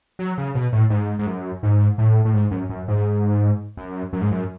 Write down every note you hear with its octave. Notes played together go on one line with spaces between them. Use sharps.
F#3
C#3
B2
A2
G#2
G#2
F#2
G#2
A2
A2
G#2
F#2
F#2
G#2
F#2
F#2
G#2
F#2